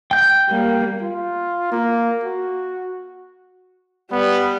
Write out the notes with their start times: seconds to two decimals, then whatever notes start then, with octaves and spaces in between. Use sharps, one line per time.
0.11 G5 G6
0.50 G3 A#3
1.01 F4
1.72 A#3
2.24 F#4
4.12 G3 B3